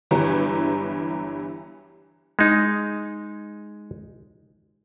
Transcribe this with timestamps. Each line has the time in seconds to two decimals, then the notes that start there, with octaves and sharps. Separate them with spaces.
0.11 G1 G2 E3 F#3 G4 B4
2.39 G#3 D#4